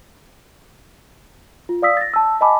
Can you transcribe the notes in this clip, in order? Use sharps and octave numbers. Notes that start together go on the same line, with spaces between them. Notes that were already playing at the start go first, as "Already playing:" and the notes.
F4
D5 F5 D#6 E6 B6
A6 A#6
A5 E6
D#5 G#5 A5 B5 D6